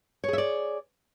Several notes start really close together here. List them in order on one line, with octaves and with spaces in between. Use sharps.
C#5 G#4 E5 D5